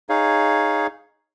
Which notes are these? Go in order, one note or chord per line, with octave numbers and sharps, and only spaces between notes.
D#4 G#4 C#5 F5